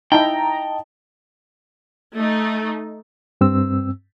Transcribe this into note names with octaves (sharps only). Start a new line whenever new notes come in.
D#4 E4 D#5 G5 A5 A#5
A3 D#4
G2 C4 E6